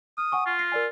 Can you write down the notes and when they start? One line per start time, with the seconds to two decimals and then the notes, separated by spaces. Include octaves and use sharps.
0.18 D#6 F6
0.32 F#5 G#5 C#6
0.46 F4
0.59 A#6 C7
0.72 A#4 D5 G#5